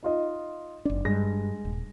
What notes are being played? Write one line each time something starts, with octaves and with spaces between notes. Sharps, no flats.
D#4 F4 D#5
F#1 D4 D5
G2 G#3 A#6
D#1